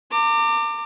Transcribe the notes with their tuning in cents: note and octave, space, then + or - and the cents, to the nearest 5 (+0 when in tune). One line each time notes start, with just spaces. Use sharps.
A#5 -40 D6 +15